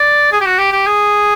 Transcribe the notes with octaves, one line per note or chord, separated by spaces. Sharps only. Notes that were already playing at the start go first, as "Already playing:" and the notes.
Already playing: D5
G#4
G4
F#4
G4
G4
G#4